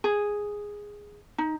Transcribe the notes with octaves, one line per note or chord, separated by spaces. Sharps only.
G#4
D#4